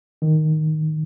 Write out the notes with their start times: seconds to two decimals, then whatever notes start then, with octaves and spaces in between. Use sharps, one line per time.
0.22 D#3